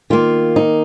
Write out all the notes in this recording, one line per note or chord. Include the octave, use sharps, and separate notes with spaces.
D#3 A#3 F4
D#4